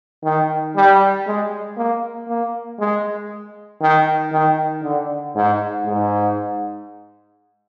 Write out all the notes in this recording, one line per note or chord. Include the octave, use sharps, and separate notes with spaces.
D#3
G3
G#3
A#3
A#3
G#3
D#3
D#3
D3
G#2
G#2